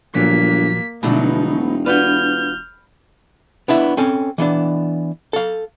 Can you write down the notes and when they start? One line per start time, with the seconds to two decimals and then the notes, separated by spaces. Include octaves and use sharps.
0.15 G1 A#2 F3 F#3 A#3 B6
1.03 E1 B2 D3 F3 F#3 A3 D#4
1.86 D4 F4 F#4 B4 F6 G6
3.68 B3 D4 E4 E5
3.97 C4 C#4 A4 G#5
4.38 E3 B3 D4
5.33 A4 F5